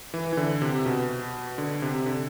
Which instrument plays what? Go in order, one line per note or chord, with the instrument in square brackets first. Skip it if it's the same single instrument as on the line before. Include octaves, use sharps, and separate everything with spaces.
[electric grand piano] E3
E3
D3
C3
B2
D3
C3
D3